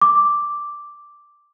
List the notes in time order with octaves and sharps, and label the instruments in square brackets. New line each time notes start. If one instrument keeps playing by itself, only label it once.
[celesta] D6